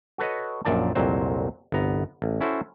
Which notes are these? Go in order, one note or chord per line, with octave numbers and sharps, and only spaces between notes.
F#4 A4 B4 C#5 D#5
A#1 F#2 A#2 D#4 D5 A5
C2 F2 A#2 F#3 C5
G1 C2 B3 A#5
A1
C#4 E4 F#4 A4 C5